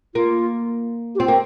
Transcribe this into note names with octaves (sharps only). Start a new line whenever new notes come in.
A#3 F4
G4
C4 F4
A#3